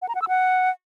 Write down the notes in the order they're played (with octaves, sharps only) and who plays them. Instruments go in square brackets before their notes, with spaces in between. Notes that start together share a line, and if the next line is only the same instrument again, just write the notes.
[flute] F#5
A#5
F#5
E6
F#5